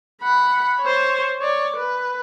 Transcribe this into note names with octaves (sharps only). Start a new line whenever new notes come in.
F#5 B5
C5 C#5
C#5 D5
B4